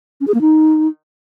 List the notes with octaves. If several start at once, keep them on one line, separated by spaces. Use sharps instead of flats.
C#4
G#4
A#3
D#4